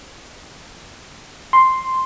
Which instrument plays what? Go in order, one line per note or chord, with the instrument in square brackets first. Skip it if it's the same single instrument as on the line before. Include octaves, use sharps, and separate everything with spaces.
[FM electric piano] C6